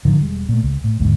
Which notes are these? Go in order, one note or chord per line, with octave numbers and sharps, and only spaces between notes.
A2 D3 D#3 F3
E1 G3 G#3
A#2 A3
C#2
A2
D#2 G#2 D3